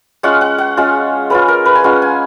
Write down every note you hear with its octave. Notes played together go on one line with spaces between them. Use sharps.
G#3 C#4 F4 F#5
F#5
F#5
G#3 C#4 F4
G#3 C#4 F4 B4
A#4
B4
G#5
G#3 C#4 F4 F#5
G#5